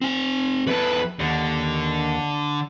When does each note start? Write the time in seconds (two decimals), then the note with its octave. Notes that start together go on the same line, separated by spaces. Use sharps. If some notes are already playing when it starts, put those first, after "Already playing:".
0.01 C4 G#5
0.67 E2 A4 B4
1.19 D#2 D3